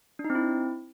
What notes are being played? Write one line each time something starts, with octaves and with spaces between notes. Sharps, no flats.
D4
D#4
C4
E4